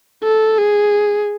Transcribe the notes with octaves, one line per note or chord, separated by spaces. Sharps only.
A4
G#4